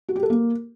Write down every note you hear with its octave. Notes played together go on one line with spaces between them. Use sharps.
F#4
G4
A4
A#3